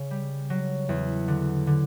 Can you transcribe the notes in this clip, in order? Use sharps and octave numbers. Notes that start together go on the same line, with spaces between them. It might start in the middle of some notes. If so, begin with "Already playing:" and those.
Already playing: C#3
G3
F#3
E2
D3
D3